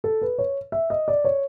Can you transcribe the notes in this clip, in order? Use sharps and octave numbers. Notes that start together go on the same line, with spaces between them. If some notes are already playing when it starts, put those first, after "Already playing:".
A4
B4
C#5
E5
D#5
D5
C#5